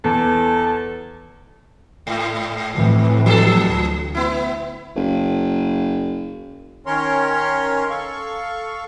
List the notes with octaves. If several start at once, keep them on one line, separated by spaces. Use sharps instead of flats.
E2 A4
G#2
F2 A2 E3
F3 A4
D2
B3 E4
F#1
D#3 C#4 A#4 C#5 C6
A4 F5 C#6